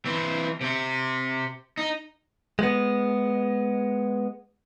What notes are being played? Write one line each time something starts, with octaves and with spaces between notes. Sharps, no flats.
E3 C4
C3 C4
D#4
G#3 B3